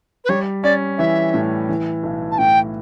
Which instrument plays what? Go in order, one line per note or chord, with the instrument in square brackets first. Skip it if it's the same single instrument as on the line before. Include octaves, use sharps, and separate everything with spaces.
[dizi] B4
[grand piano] G3 [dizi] C#5
[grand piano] C#4 [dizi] D5
[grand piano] E3 [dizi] E5
[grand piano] A2
E3
B1
[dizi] A5
[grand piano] A2 [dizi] G5